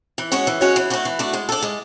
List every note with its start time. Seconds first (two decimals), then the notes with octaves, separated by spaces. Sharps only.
0.18 E3
0.32 G#3 C#4 F#4 C#5
0.47 E3
0.61 G#3 C#4 F#4 C#5
0.76 E3
0.90 A3 D4 F#4
1.05 E3
1.19 A3 D4 F#4
1.33 G#3
1.49 D4 A4
1.62 G#3